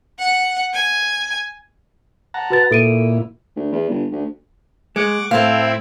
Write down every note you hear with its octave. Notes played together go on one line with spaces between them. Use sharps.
F#5
G#5
F#5 A5 A#5
F#4 B4 A6
A#2 E4 A4 D7 D#7
D2
E2
G1
D2
G#3 F#5 C#6 D6
A2 C4 E4 A4 C5 F5